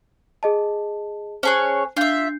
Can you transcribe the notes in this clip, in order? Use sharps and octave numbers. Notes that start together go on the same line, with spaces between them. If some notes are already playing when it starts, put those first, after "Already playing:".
G#4 D#5 A5
C#4 G#4 C5 C#5 A5 F#6
D4 F4 E5 G6 C7